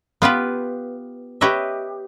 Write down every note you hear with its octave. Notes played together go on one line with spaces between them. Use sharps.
B3 F4 G4 B4
G4 B4 C#5 D#5 E5